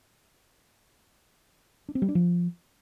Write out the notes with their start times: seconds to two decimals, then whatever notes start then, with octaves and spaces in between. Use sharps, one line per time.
1.89 D4
1.95 C4
2.02 G3
2.09 D4
2.15 F3